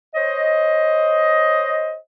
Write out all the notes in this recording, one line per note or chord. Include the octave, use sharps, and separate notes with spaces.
C5 C#5 D#5